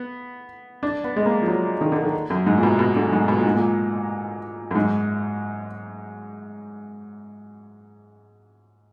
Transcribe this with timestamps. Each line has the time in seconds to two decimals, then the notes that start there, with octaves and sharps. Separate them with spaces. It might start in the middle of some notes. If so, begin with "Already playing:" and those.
Already playing: B3
0.83 D4
1.04 B3
1.16 G#3
1.26 A#3
1.42 F3
1.48 F#3
1.81 D#3
1.92 D3
2.03 D#3
2.30 F#2
2.47 G#2
2.58 A#2
2.63 B2
2.79 B2
2.96 D3
3.12 G#2
3.28 B2
3.37 A#2
3.46 G#2
3.55 A#2
4.71 F#2
4.75 G#2